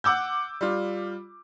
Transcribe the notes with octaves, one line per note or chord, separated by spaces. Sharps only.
F#5 D6 E6 G6
G3 F4